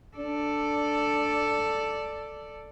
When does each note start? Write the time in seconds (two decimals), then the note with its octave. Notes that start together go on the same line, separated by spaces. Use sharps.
0.17 D4 A4 D5